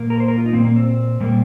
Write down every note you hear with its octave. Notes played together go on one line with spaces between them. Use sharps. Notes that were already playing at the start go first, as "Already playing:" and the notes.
Already playing: A#2 A#3
A#4
C5
A#4
F4
D#4
A#2 A#3 C4
A#3
C4
A#2 G3 A#3